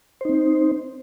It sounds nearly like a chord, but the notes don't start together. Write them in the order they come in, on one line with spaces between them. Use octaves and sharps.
C5 D#4 C4